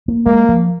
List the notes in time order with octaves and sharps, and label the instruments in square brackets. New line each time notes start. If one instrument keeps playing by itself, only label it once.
[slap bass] A#3
[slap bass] G#3 [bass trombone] A#3
[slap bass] F3